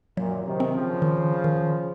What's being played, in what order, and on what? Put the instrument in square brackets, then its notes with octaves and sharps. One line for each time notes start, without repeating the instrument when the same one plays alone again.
[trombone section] F#2 A#2 [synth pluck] F#3
[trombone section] C3 D#3
[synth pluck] C4
[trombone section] C#3 F3
[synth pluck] D#3
D#3